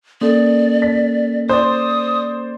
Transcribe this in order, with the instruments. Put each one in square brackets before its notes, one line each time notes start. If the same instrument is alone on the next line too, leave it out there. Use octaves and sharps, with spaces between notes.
[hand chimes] A#3 C#4 A4 [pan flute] D5
[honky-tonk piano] B6
[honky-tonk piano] C5 D5 [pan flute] D#6